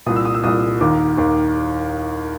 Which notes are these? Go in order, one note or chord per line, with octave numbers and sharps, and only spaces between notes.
C2 A#2 D#6
E6
D#6
E6
C2 A#2 D#6
D#6
D#2 D#3 D6
D#2 D#3